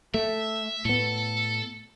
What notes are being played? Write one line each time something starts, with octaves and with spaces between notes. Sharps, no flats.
A3 E5
A2 B3 A4